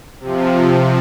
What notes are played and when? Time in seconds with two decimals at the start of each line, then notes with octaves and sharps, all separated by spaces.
0.20 C3 F3